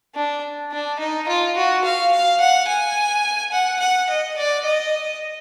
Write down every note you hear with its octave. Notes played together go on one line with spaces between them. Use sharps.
D4
D4
D#4
F4
F#4
F5
F5
F#5
G#5
F#5
F#5
D#5
D5
D#5